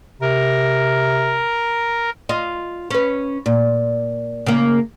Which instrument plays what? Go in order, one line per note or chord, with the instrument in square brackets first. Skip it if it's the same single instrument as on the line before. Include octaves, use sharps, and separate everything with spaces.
[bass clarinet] C3 [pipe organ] A#4
[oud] F4 D#5
C#4 B4
A#2
C#3 A#3